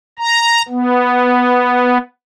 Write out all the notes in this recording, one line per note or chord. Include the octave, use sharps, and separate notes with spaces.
A#5
B3